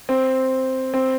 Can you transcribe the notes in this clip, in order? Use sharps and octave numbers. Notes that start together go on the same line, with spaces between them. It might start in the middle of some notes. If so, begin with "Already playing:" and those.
C4
C4